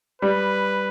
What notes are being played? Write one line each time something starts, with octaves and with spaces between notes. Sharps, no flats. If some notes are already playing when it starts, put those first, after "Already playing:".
G3 B4